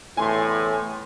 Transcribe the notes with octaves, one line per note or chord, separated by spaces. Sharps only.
E2 A2 G#5 C6